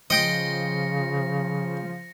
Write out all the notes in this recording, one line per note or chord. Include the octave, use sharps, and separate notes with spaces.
C#3 F3 D#5 G5 D#6 A#6 C#7